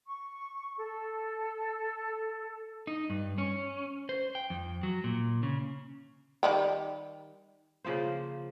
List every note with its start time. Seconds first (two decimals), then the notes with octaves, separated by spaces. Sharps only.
0.06 C#6
0.78 A4
2.87 D#4
3.10 G2
3.38 C#4
4.09 C5
4.35 G5
4.50 F2
4.83 F#3
5.04 A#2
5.43 C#3
6.43 D#3 G3 G4
7.84 C#3 F3 A#3 C5